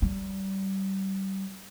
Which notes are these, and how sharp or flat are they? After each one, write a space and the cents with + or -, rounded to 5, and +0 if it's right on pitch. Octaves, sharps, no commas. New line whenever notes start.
G3 -25